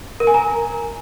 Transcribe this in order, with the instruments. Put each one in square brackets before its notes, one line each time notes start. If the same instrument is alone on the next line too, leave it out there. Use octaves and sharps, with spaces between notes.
[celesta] A#4
G#5
A#5